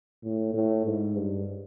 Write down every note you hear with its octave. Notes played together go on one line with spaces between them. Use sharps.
A2
A2
G#2
G2